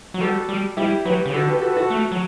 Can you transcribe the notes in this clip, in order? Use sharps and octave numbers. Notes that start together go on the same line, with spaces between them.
F#3
G3 F#4 A4
G3
G3 E4 G4
F#3 G4 B4
C#3
D3 F#4 A4
G4 B4
F#4 A4
B4
F#4 A4
A3
F#3